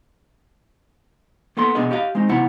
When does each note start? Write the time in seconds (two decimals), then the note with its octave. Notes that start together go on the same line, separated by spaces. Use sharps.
1.57 A#3 B3 A4 C6
1.75 C2 B2 B3 D4 G#4 D#5
1.91 G4 D#5 F5
2.15 G#3 C4 D#4
2.28 B1 C3 B3 E4 F#5